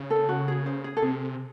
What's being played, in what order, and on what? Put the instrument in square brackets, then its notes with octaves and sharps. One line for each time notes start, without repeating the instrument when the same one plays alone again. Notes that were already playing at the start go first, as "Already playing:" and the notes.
Already playing: [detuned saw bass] C#3
[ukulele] A4
F#4
G#4
C5
G#4
A4
[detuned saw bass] C3 [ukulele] G#4